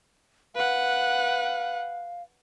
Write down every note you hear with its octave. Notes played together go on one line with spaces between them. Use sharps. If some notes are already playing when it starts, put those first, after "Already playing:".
B4 F5 F#5